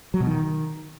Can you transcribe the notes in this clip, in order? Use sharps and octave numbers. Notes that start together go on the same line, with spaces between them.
F#3
B2
D#3